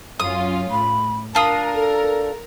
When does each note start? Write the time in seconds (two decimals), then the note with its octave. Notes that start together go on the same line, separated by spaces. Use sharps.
0.20 F#2 C#4 F4 D#6
0.71 A2 B5
1.35 D4 F4 A#4 A5 D#6
1.74 A4